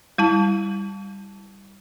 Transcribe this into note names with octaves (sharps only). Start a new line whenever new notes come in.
G3 E4 A5